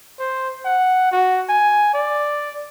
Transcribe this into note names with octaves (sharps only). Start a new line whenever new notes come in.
C5
F#5
F#4
G#5
D5